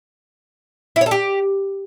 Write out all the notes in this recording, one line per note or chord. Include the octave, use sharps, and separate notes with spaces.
E4
C#5
A4
G4